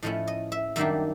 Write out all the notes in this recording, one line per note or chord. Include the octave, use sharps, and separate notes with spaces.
A2 F3 A3 C#4 E4 D#5
D#5
E5
F#2 D#3 G3 A#3 D4 E5